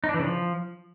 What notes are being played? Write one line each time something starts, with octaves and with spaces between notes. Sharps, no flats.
D#4
D4
E3
C#3
F3